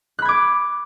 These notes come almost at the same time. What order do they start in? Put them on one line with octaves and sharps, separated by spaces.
F#6 B5 G#6 D6